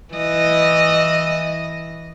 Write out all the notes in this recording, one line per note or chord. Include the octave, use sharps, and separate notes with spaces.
E3 D#5